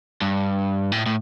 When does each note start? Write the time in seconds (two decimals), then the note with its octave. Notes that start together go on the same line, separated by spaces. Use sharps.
0.21 G2
0.92 A2
1.06 A2